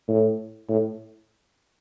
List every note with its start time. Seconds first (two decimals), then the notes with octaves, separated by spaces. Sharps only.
0.08 A2
0.69 A2